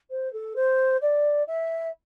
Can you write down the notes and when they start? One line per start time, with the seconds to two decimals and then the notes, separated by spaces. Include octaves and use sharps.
0.10 C5
0.33 A4
0.56 C5
1.01 D5
1.47 E5